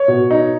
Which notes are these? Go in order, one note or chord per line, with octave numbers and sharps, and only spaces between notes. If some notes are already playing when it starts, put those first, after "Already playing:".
Already playing: C#5
B2
D#4